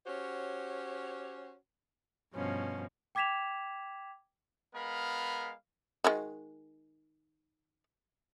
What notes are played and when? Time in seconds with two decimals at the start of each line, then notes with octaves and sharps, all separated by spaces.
0.06 C#4 F#4 G4 C5 C#5
2.35 G2 B2 F3 C#4
3.15 G5 D6 G#6 B6 E7 F7
4.75 G#3 B3 A#4 F5 B5
6.04 D#3 G#3 F#4